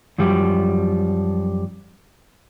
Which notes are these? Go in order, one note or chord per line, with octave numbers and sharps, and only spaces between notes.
F#2 F3 G3